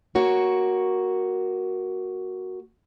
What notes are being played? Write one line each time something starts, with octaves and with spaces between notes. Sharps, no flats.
A#3 F#4 C#5